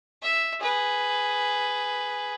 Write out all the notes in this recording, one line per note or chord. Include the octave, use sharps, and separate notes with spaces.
E5
G#4 B4